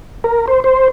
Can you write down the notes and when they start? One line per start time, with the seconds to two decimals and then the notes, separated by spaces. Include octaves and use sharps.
0.24 A#4
0.48 C5
0.64 C5